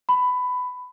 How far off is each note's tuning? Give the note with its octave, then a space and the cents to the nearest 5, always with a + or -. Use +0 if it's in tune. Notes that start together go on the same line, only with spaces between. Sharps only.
B5 +15